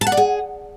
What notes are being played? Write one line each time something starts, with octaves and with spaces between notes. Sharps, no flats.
A5
F#5
D5
G#4